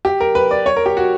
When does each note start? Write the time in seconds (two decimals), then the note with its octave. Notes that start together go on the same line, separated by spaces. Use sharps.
0.05 G4
0.20 A#4
0.35 B4
0.51 D5
0.66 C#5
0.76 A#4
0.86 G4
0.97 F#4